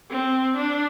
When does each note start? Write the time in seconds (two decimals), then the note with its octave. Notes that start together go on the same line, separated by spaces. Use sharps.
0.11 C4
0.57 D4